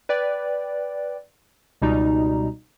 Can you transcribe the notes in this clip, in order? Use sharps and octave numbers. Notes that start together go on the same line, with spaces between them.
B4 D5 G5
C#2 B2 G3 D#4 A#5